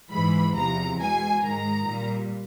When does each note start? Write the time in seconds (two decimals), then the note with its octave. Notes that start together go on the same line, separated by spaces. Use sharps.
0.11 G#2 E3 G#3 B5
0.55 E2 C3 F3 A#5
0.99 B2 G#3 G#5
1.42 G#2 D#3 G#3 A#5
1.87 A#2 G3